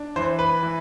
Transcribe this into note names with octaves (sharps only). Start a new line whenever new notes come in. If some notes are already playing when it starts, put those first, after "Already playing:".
Already playing: D4
E3 C5
B4
E3